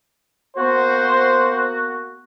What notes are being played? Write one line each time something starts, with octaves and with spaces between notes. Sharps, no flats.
A#3 B3 F#4 C5